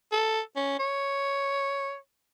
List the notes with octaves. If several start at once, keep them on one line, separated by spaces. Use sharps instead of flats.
A4
C#4
C#5